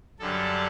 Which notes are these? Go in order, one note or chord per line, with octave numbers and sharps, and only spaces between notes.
F#2 D3 G3 A4